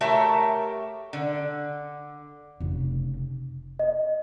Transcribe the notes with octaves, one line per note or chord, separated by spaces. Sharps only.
A3 F#4 G4 A#4 C#5 E5
D3
F1 C#3
D#5